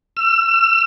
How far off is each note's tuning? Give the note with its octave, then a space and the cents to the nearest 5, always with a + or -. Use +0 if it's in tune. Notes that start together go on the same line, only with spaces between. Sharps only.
E6 +35